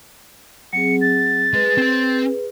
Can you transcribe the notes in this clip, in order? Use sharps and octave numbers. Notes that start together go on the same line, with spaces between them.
F#3 C4 G#4 C#7
A6
G#3 G#4 B4
C4 C6